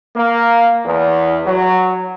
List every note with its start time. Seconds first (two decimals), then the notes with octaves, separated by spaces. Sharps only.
0.15 A#3
0.85 E2
1.46 F#3